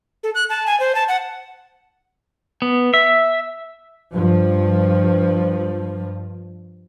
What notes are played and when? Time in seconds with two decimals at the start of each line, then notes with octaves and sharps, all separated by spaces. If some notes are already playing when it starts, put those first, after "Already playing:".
0.23 A4
0.35 F#6
0.49 A5
0.67 G#5
0.80 C5
0.95 A5
1.08 F#5
2.62 B3
2.94 E5
4.13 G2 F3